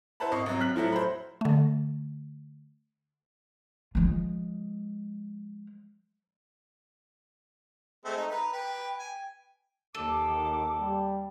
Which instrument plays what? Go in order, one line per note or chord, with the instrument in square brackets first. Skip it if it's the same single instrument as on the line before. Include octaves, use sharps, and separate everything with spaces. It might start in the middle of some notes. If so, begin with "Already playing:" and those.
[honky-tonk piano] E4 B4 C5 F#5 A5 B5
G#1 D#5 C#6 C7
G#1 C3 F#3
F6 F#6 B6 F#7
A2 F3 F#3 A3
C5 B5
[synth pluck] D3 A3
[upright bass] F3 G#3
[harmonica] G#3 A3 C4
D#4
[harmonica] B4 [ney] A#5
[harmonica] B4 [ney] G5
[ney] G5 [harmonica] G#5
[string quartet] D#2 [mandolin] A4 [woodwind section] D6
[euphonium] D#3
G3